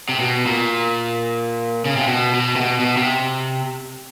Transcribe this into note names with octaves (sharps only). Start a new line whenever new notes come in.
C3
B2
A#2
C#3
C3
B2
B2
C3
B2
B2
C3